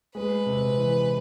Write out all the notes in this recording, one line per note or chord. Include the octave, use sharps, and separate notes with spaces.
G#3 B4
C3
E3